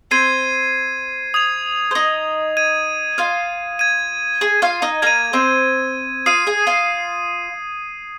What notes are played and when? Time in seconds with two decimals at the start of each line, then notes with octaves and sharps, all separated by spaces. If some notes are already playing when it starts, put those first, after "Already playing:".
0.11 C4 C5 G#6 C7 D#7
1.34 D#6 G#6 F7
1.91 C5
1.95 D#4 D#5
2.57 G#6 D#7
3.18 F4 F5
3.79 G#6 D#7
4.41 G#4 G#5
4.62 F4 F5
4.82 D#4 D#5
5.02 A#3 A#4 G#6 D#7
5.33 C4 C5
6.26 F4 F5 D#6 C7 D#7
6.47 G#4 G#5
6.67 F4 F5